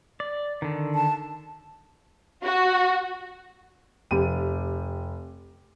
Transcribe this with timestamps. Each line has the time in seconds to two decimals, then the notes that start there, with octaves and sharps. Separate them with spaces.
0.20 D5
0.62 D3 D#3
0.95 A5
2.45 F#4
4.11 F1 G4 D#7